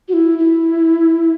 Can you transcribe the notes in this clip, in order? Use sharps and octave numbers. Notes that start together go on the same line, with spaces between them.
F#4
E4
E4